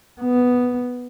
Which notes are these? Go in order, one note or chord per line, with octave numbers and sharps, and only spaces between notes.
B3